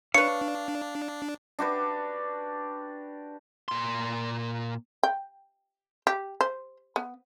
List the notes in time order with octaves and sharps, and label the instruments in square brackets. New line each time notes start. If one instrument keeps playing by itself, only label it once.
[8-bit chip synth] D4 [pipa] B4 C#5 [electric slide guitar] F5 [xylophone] C#7
[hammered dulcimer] D4 F#4 G4 B4
[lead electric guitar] A#2 C6
[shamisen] G5
G4
C5
B3